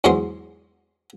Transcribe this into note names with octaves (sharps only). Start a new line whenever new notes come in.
E2 G#2 F#3 G#3 D#5 C6